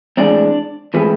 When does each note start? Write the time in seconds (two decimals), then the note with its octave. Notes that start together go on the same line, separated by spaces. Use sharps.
0.17 A2 E3 G#3 C4 D4 D5
0.94 A2 E3 G#3 C4 B4